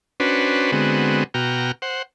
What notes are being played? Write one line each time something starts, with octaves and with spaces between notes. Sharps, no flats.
C#4 D4 F#4 B4 C5
D3 G#3 B3 C4 F#4
B2 F#4 G5 A#5 F6
C5 F#5